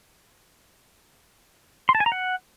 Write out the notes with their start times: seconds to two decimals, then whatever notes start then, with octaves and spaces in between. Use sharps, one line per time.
1.89 C6
1.95 A5
2.00 G#5
2.06 A#5
2.12 F#5